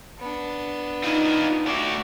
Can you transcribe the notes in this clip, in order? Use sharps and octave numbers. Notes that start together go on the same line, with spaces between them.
B3 D4
D#4 F4 D#5
A3 F#4 D5 E5